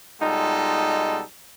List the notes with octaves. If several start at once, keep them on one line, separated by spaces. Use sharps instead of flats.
B2 G3 G#3 D#4 F4 A4